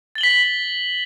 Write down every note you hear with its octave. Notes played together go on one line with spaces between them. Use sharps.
A6 B6 F#7 G7